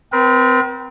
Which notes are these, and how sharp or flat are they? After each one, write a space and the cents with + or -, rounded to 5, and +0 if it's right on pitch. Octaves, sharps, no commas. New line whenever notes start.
C4 -25 A#4 +45